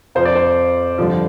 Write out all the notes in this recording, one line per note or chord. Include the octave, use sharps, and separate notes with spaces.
F2 F3 C5
D5
C5
G2 D3 F3